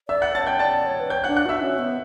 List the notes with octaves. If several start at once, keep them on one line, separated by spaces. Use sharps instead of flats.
D5 E5 E6
F#5 F#6
C#5 A5 A6
G5 G6
D5 A5 A6
C#5
B4
C#5 G5 G6
F#5 F#6
D4
F#5 F#6
F#4 E5 E6
C#4
B3